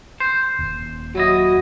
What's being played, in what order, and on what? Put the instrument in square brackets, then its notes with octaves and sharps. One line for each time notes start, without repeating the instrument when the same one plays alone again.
[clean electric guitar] C5
[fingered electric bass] D#1
[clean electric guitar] F#3 E4 D#5 [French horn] F#4